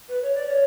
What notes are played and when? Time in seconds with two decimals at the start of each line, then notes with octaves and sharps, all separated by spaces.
0.09 B4
0.23 C#5
0.35 D5
0.47 C#5